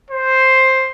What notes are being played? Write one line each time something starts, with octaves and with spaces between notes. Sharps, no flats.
C5